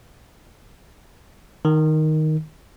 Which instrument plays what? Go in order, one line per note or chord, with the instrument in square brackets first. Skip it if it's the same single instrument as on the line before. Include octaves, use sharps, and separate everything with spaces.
[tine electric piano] D#3